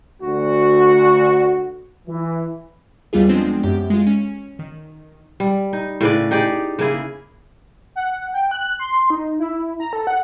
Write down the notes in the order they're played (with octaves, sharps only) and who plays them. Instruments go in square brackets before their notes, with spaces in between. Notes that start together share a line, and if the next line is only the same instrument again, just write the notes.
[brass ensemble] D2 F#4
E3
[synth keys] D#2 G3 B3 F4 G#4
F3 G#3 B3 C4 D4
F#2 G4 G6
G#3 F4
C#4
D#3
[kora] G3
D#4
A2 C#3 B4 D5
D#4 G4 G#4 D5
C#3 A#3 E4 G#4
[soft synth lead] F#5
G5
F#6
C6
D#4
E4
A#5
A4
F#5